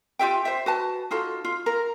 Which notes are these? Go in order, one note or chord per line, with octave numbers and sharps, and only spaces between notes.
F4 G4 E5 G5
C5 E5
F#4 B4 A5
D#4 F4 F#4 A4
F4
A#4